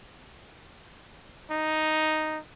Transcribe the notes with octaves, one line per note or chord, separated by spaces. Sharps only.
D#4